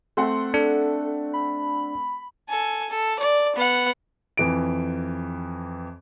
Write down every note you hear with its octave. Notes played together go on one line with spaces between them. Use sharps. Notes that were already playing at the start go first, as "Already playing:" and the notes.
A3 C4 F#5 C6
D4 A4
B5
A4 G#5
A4
D5
B3 F#5
F2 E3 D7